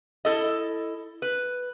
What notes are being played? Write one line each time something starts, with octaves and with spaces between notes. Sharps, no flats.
E4 A4 D#5
B4